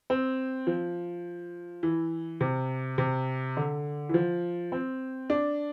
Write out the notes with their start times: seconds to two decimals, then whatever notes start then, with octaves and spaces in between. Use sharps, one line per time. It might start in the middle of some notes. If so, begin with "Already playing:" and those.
0.10 C4
0.67 F3
1.83 E3
2.41 C3
2.98 C3
3.57 D3
4.09 E3
4.14 F3
4.72 C4
5.30 D4